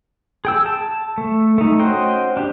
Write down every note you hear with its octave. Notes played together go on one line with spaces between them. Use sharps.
G#4 G5 E6
A5
A3
A3 D#4
C#4 F#4 C5 D#5 G5
D4 G4